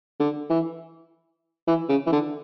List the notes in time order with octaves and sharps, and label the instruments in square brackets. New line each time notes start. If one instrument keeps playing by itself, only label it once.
[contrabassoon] D3
E3
E3
C#3
E3
D3